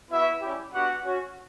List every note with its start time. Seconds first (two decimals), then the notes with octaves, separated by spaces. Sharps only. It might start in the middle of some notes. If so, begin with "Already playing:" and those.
0.11 B3 E4 F#4 E5
0.41 G3 C#4 E4 G4
0.72 B3 D4 F#4 G4 F#5
1.04 C#4 F#4